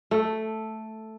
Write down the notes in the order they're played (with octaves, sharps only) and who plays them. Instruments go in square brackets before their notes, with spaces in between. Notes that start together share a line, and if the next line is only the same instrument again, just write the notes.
[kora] A3